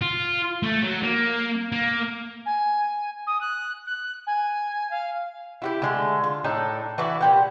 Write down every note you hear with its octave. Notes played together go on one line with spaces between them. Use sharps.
F4
A3
F#3
A#3
A#3
G#5
D#6
F#6
F#6
G#5
F5
E4 F#4 G4
D3 G#3 A3
F4
A2 D4 D#4 A4
E3 F#4 D5 E5
A#2 G4 F#5